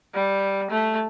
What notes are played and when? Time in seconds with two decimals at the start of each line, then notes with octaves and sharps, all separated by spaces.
0.14 G3
0.71 A3